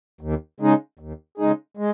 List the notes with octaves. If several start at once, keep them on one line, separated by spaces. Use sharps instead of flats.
D#2
C#3 G#3 D#4 G#4
D#2
C#3 G#3 D#4 G#4
G#3